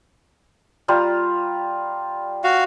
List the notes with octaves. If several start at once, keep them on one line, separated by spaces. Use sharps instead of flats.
G3 F4 A#5
F#4 F5